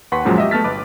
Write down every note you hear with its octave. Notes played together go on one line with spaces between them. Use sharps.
D#2 B4 F#5 C6 C#6 B6
C#2 F#2 A#2 F3 F#3 G#3
G4 D#5 E5
A3 B3 A5 F6 A6 B6
G1 B4 D6